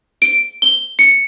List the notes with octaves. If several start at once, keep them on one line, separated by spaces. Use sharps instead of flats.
D7
G7
C#7